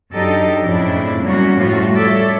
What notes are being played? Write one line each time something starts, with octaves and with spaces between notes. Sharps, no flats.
F#2 D4 D#4 G4 A4 D#5
F2 A2 C#3 D4 E4
F#2 F#3 G3 A#3 C#4 F#4
A2 F3 G3 A3 F4 F#4
G3 A4 C#5 D5 E5